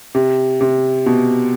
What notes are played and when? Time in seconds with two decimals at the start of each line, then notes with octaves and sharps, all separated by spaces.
0.15 C3
0.61 C3
1.06 B2